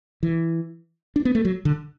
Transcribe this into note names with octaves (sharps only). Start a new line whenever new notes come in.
E3
D4
B3
A3
F#3
D3